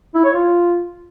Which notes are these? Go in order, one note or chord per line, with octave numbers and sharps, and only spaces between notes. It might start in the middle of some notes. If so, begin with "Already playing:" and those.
E4
C#5
F4